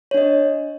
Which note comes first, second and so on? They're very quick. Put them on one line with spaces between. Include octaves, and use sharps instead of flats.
C#5 D4 D#5